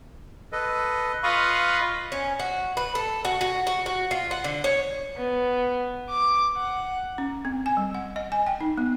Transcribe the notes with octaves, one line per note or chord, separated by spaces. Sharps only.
A4 B4 D#5
F4 B4 D#5 F5 B5 C#6
C#4
F#4
B4
A4
F#4
F#4
F#4
F#4
F4
F#5
D3
C#5
B3
D6
F#5
C#4
C4
G#5
G3
F#5
D#5
G#5
G5
D#4
B3